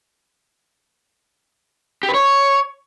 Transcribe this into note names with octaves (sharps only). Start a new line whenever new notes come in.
G4
B4
C#5